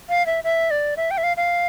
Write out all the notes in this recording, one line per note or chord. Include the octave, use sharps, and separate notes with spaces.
F5
E5
E5
D5
E5
G5
E5
F5
F5